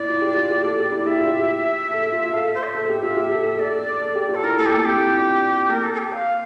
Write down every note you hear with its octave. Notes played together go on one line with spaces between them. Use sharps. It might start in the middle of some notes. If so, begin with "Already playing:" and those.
Already playing: E4 D5
F4
G4
F4
G4
A4
G4
E4
G4 E5
F4
G4
A4
F4
A4 F5
E5
C5
E5
A4
G4
F4
G4
A4
A4
A4 D5
A4
G4
F4
A4
E4 A#4
A3 A4
G4
A#3 A4
C4 G4
E4
F4
D4
A#3 A#4
A4
A4
G4
F5